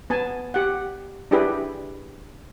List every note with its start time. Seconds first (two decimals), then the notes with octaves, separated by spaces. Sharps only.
0.10 B3 G#5 A5
0.54 G4 F#5
1.31 D4 E4 G4 G#4 B4